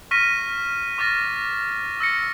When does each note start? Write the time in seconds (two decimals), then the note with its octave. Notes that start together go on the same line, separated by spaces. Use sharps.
0.11 C#6 F6 A#6 B6 D#7
0.98 C#6 D6 F6 A6 A#6
2.00 E6 A#6 C#7